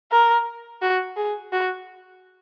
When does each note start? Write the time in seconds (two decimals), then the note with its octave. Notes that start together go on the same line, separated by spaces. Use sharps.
0.12 A#4
0.82 F#4
1.16 G#4
1.52 F#4